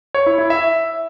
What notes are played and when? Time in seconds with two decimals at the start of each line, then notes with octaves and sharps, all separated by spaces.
0.15 C#5
0.26 E4
0.38 E4
0.50 E5